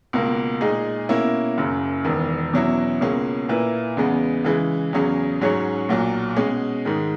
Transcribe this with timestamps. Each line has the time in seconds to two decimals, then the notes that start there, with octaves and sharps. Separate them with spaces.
0.13 C#2 B2 A#3
0.61 A#2 G#3 D#4 G#4
1.09 B2 A#3 C#4 E4
1.58 F#1 F#2 C#3
2.04 E1 E2 D#3
2.53 E2 B2 F#3 C#4 E4
3.01 C#2 B2 A#3 C#4 G#4
3.49 A#2 A#3 E4 B4
3.97 E2 C#3 G#3 B3
4.44 C#3 E3 G#3
4.93 E2 C#3 F#3 C#4 G#4
5.41 G#2 F#3 C#4 G#4 C#5
5.89 B1 A#2 F#3
6.37 B2 G#3 C#4 G#4
6.85 G#2 D#3 G#3